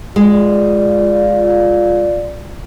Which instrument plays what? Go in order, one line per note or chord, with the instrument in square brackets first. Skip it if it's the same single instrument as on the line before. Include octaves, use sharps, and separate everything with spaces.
[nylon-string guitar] G#3 [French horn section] F4 D5